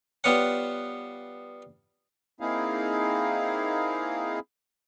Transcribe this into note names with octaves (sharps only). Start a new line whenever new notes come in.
G3 B3 F4 C#5 F#5
A#3 C4 D#4 E4 G#4 F5